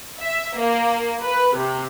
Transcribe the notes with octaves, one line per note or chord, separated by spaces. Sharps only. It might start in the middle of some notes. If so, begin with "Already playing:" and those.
E5
A#3
B4
C3